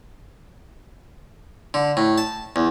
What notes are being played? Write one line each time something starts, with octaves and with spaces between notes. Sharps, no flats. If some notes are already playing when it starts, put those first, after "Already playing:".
D3
A2
A5
E2